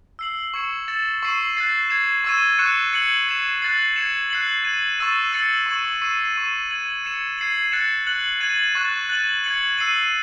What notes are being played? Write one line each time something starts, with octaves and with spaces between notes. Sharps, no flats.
E6 C7 F#7
C#6 G#6 C#7 E7
E6 A6 C#7 E7
C#6 E6 C7 D#7 F#7
F#6 A6 C7
G#6 C7 E7
C#6 E6 G#6 D#7
C#6 F#6 C#7 E7
G#6 C#7 F#7
G#6 C7 E7
F#6 A6 C7 F#7
G#6 C#7 E7
F#6 C7 F#7
G#6 D#7 F#7
C#6 E6 A6 D#7
E6 A6 C#7 F#7
C#6 G#6 D#7 F#7
C#6 E6 G#6 C7 D#7
C#6 E6 C7 D#7
G#6 D#7 F#7
E6 G#6 C#7 E7
G#6 C7 D#7 F#7
F#6 A6 C#7 E7
F#6 C#7 F#7
G#6 D#7 F#7
C#6 F#6 A6
F#6 A6 D#7 F#7
G#6 C#7 F#7
E6 C7 D#7 F#7